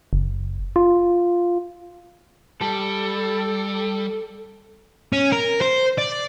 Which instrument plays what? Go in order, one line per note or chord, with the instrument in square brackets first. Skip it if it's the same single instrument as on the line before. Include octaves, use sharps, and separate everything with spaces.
[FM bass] F#1
F4
[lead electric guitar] G3 [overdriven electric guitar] A4
[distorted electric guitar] C#4
A#4
C5
D5